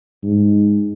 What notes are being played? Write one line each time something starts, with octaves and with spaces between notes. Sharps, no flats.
G#2